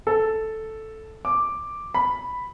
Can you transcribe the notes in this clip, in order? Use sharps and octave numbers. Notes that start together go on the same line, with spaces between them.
A4
D6
B5